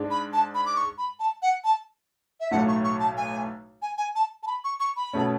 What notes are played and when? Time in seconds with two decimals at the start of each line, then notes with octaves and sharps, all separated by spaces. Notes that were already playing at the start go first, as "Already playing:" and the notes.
Already playing: G#2 G#3 D4
0.10 B5
0.33 A5
0.55 B5
0.66 D6
0.76 C#6
0.98 B5
1.20 A5
1.42 F#5
1.64 A5
2.40 E5
2.51 B1 A2 F#3 A3 E4 F#5
2.68 C#6
2.84 C#6
3.00 A5
3.17 G#5
3.82 G#5
3.98 G#5
4.15 A5
4.43 A5
4.47 B5
4.64 C#6
4.80 C#6
4.97 B5
5.13 B2 A3 C#4